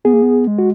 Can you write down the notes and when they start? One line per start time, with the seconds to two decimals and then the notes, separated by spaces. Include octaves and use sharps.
0.04 B3 G#4
0.13 A#3
0.22 B3
0.47 G#3
0.59 F#4